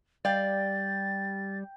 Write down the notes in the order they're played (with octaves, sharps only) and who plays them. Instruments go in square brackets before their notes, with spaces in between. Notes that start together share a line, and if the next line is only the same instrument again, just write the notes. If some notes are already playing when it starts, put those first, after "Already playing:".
[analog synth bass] G3 [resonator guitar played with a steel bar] D5 F5 [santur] G5 [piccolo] A6